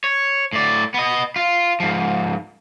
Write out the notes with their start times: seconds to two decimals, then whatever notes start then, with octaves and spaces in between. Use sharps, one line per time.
0.04 C#5
0.53 A2 D5
0.94 B3 D#5
1.36 F4
1.80 G#2 F3